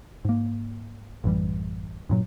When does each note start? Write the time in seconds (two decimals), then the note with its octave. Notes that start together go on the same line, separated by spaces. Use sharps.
0.25 G#2 A#3
1.24 A1 F#2 E3 G3
2.09 G2 A#2 F#3